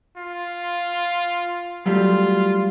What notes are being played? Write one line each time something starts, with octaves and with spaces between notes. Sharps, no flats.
F4
F#3 G3 A3 F4